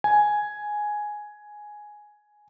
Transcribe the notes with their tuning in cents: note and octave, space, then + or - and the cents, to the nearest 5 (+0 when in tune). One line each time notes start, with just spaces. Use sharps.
G#5 +5